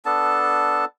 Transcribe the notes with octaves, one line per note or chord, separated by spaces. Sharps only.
B3 D4 A4 A5